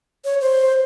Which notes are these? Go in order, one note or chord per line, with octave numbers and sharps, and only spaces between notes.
C#5
C5